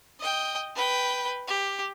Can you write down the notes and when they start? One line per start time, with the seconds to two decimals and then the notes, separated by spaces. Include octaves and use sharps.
0.19 D#5 G5
0.75 B4 G5
1.47 G4